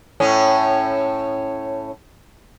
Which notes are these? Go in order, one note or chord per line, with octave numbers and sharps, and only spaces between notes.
A2 C#4